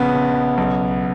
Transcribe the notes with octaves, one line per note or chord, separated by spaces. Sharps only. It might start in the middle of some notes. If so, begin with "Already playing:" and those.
Already playing: A#1 C#3 B3
C#3
B1